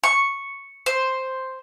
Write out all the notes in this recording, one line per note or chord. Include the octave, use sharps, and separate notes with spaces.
C#6
C5